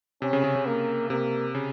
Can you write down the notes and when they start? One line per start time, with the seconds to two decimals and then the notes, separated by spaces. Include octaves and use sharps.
0.22 C3 C#4
0.33 C#3
0.44 C#3
0.56 C#3
0.66 A#3
1.10 C3 A#3
1.55 C#3